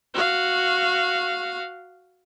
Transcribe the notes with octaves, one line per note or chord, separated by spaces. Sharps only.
F#4 F5